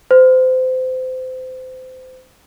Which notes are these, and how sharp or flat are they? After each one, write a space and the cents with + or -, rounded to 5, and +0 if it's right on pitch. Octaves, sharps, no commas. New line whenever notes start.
C5 -30